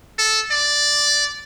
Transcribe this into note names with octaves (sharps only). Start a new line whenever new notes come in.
A4
D5